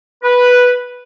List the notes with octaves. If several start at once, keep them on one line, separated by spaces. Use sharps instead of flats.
B4